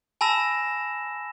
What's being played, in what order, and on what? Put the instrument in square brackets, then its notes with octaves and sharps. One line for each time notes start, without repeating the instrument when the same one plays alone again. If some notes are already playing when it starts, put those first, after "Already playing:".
[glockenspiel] G#5 A5 B5 E6 A#6 E7